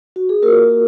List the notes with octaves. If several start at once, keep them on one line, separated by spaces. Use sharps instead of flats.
F#4
G#4
A#3 F4 F#4 A#4